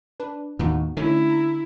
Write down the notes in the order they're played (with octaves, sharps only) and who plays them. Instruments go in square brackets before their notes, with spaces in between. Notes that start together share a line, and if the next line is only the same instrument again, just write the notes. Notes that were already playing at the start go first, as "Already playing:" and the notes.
[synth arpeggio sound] D4 B4
[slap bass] D#2 A2 [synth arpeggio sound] B3 D#4 F#4
[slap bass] D3 [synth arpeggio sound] A3 C#4 D#4 [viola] E4
[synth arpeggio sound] A#5